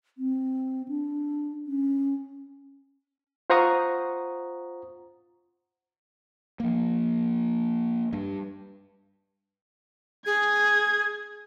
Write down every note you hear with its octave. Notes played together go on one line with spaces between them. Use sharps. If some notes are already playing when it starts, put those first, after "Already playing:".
C4
D4
C#4
F4 C5 F#5 A#5 C#6 D#6
F3 A#3
G2
G#4 G#6